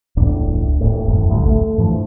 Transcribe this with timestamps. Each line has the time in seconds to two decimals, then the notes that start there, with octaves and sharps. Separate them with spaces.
0.17 E1 C#2 A2 D4
0.80 D#1 A2
1.08 E1 F#2 A2
1.29 A1 D2 G2
1.46 A3
1.78 G2 E3 F3